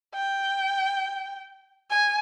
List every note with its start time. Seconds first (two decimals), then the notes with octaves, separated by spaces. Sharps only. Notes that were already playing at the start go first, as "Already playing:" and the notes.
0.14 G5
1.90 G#5